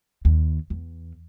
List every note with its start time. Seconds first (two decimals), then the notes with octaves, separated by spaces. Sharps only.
0.25 D#2
0.70 E2